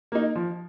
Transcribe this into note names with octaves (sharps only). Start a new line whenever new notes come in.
A#3 D#4
F3